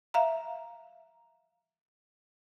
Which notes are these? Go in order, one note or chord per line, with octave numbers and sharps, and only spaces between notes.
E5 F5 A#5